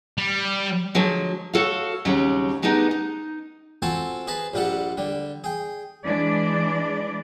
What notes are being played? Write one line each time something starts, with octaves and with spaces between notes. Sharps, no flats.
G3
D3 F3 F#3 G#3
F#4 A4 C#5 F5
D#2 C#3 F#3 G3 C4
G3 G#3 B3 D4 D#4 G4
D#4
C4 F4 F#4 A4 G#5 A5
G#4 B4 D#5 A5
A#1 G3 F4 A4 F#5
D3 G3
G#4 G5
E3 G#3 D4 D5